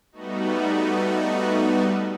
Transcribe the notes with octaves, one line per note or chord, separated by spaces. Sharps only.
G3 A3 B3 D#4 F#4